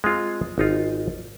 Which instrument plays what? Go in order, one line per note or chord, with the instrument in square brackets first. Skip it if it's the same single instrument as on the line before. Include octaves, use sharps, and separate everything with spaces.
[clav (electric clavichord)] G#3 C4 F4
G#1 D#4 F4